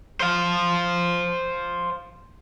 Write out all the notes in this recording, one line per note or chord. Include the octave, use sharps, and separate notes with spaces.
C5 F5